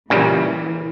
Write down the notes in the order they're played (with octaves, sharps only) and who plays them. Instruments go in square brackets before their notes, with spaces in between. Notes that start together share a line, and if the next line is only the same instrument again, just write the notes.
[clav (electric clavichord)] A#2 C#3 G3 [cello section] E3